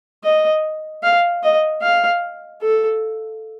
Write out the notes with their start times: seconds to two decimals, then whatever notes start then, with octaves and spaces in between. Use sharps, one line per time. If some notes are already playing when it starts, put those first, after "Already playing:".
0.24 D#5
1.03 F5
1.43 D#5
1.82 F5
2.62 A4